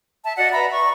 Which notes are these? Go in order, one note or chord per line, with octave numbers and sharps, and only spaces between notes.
E5 A5
F#4 D5 D#5 F#5
B4 E5 A#5 B5
C#6